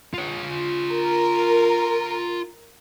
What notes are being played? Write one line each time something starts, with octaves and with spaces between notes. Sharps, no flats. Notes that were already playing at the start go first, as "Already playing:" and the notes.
F4 C#5
A#4